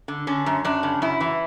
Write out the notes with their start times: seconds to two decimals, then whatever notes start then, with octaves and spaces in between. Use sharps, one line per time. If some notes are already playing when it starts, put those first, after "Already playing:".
0.08 D3
0.27 D3 C#4
0.46 F#2
0.64 F#2 D4
0.83 C#3
1.02 F#2 E4
1.20 E3